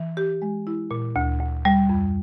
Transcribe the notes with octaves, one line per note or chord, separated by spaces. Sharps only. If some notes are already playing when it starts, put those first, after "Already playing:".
Already playing: E3
G4
G#3
E4
A#2
D2
D2
G3
F2